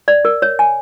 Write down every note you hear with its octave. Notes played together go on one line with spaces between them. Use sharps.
D5
A#4
C#5
G#5